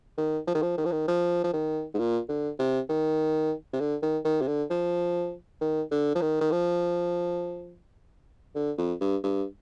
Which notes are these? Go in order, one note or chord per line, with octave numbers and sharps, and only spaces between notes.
D#3
F3
D#3
F3
D#3
F3
D#3
F3
F3
D#3
G#2
A#2
D3
C3
D#3
C3
D3
D#3
D#3
C3
D3
F3
D#3
D3
F3
D#3
D#3
F3
D3
F2
G2
G2